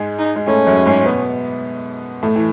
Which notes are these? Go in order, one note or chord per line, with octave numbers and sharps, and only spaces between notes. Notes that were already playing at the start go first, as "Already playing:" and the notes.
Already playing: G#2 G#3
D#4
G#3
A2 A3 C#4
F#2 F#3
G#2 G#3
B2 B3
A2 A3
E3